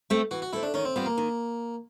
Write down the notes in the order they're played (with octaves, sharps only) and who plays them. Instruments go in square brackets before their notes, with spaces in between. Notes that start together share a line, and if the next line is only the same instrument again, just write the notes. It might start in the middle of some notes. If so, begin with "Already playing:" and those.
[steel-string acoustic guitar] A3 C4
[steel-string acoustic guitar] E3 [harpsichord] F#4
[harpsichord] F#4
[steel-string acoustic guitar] A3 C4 [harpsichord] E4
[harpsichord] D4
[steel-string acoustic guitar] D#3 [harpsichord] C#4
[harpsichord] C4
[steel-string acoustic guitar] G3 C4 F4 [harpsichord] B3
[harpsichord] A#3
[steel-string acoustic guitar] D#3